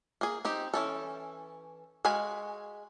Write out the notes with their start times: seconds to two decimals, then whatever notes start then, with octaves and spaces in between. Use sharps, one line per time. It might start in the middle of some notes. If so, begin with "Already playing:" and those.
0.21 A#3 G#4
0.45 C4 D#4 G4
0.74 E3 C#4 A4
2.05 G#3 F#4 F5 G#5 B5